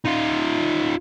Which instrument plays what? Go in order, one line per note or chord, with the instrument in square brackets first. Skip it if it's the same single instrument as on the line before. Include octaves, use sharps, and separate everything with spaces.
[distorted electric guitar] D#4 F4